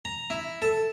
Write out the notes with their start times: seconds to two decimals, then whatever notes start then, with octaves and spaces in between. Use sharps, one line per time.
0.05 A#5
0.30 E4
0.62 A4